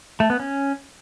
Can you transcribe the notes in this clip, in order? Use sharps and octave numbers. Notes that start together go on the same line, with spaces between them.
A3
B3
C#4